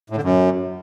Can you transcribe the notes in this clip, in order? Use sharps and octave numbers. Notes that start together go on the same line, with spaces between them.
A2
D3
F#2